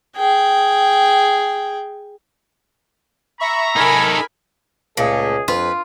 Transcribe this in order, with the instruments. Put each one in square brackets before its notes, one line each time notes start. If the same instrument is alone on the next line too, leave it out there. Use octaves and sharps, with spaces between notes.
[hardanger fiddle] G#4 G5
[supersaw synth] E5 B5 C#6 [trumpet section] A#5
[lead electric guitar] D#4 A4 [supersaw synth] A#4 [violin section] G#5 B5
[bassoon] C#2 [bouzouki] A#2 A3 [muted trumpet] G#4
[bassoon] F2 [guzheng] F4 [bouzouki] B4